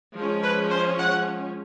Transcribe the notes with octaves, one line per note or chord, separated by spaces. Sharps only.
F3 G#3 C#4
B4
C5
F#5